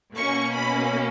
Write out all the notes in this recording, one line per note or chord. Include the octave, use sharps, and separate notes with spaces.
B2 A#3 C#4 C#6
B5